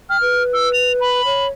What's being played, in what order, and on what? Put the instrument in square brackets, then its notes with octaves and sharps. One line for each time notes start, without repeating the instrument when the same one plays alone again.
[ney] G5 [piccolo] F6
[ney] B4
[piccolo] E6
F7
B5
[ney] C#5